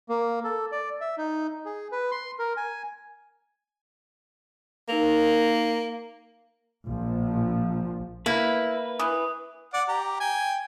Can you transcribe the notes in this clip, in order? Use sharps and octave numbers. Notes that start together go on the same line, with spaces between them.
A#3
A4
D5
E5
D#4
G#4
B4
C6
A#4
G#5
A#3 D#4 A#4 F7
A#1 F3
A#3 E4 B4
E3 D#6
D5 F#5
G4 A#5
G5 G#5